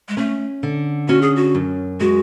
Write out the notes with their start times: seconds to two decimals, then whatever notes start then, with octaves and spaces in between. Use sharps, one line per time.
0.09 G#3
0.17 A3 C#4
0.63 D3
1.08 C#4 F#4
1.22 G#4
1.36 F#4
1.55 F#2
2.00 G#3 F#4